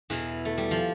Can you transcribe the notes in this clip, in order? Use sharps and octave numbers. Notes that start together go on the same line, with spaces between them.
E2 B2 E3
A3
G3
F3